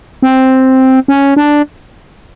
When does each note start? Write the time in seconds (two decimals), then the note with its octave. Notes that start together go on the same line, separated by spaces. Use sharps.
0.23 C4
1.08 C#4
1.37 D4